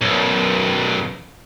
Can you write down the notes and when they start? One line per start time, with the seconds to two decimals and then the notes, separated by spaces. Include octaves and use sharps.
0.01 B1 F#2